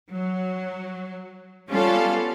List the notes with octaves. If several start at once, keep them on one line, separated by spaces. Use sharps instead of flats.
F#3
G3 B3 C#4 F4 A4 F5